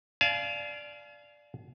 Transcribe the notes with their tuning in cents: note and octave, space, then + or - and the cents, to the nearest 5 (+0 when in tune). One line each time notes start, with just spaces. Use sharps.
D5 +0 F5 -15 G#5 +45